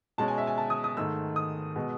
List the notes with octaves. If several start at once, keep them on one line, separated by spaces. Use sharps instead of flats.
B2 G#3 C#4 A5
G#5
E5
G#5
A5
D#6
D#6
G#2 D#3 A3 E6
D#6
B2 G#3 B3